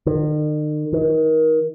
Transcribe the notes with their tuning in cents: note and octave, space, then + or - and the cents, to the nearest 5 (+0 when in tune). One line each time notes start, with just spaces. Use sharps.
D#3 -45
D#3 +25